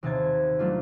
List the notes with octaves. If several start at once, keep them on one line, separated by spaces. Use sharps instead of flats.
D#2 C3 A5 G#6
F#3 A3 D4 F4